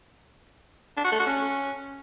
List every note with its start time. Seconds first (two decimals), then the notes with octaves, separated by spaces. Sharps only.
0.96 D4
1.04 F#4
1.12 A3
1.19 F#4
1.27 C#4